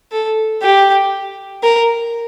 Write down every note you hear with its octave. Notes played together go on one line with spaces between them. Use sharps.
A4
G4
A#4